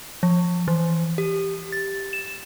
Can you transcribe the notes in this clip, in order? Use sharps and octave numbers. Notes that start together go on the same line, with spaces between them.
F3
E3
G4
A6
E7